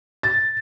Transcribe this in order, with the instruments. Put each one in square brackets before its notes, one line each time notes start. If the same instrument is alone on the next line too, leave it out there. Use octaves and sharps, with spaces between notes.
[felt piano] A6